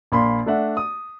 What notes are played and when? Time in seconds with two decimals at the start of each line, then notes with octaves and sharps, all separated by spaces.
0.12 A#1 A#3 B5 C6
0.46 A3 D4 E5 F#5
0.77 D#6